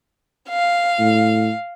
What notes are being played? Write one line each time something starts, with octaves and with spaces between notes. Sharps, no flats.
F5
A2